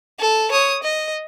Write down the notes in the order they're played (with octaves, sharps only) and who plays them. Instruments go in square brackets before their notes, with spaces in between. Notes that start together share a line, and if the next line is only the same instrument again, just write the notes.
[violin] A4
C#5 D#6
D#5